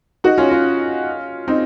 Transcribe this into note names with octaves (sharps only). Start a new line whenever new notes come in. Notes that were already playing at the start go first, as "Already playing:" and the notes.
D#4 F#4
C#4 F4
C#4 F4
C4 D#4